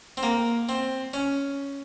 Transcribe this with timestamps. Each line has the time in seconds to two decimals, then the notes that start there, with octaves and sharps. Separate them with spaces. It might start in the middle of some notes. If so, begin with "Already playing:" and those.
0.17 C4
0.23 A#3
0.69 C4
1.14 C#4